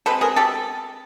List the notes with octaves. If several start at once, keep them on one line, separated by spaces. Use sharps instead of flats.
B2 G#3 C4 A4 B4
G#4 A#4
G4 A4